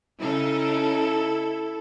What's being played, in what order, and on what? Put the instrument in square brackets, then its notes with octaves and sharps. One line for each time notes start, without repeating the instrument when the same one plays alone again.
[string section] C#3 D#4 [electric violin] E4 A4